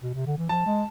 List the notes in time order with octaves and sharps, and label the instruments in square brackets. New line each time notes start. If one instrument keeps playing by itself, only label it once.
[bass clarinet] B2
C3
D3
E3
[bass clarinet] F3 [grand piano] A5
[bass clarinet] G#3